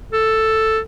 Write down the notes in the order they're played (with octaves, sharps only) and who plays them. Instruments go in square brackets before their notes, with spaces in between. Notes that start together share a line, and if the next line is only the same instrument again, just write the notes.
[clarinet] A4